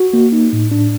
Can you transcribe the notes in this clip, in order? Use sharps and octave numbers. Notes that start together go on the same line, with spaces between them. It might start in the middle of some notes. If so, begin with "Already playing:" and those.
Already playing: F#4
A#3
D#4
A2
D4